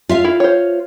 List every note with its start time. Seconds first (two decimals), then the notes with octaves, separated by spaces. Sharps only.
0.09 F4 E5 F5
0.24 E4
0.40 C5 C#5